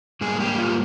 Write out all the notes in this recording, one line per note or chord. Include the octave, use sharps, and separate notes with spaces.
G#2 G3 A#3 G#4
G4
F4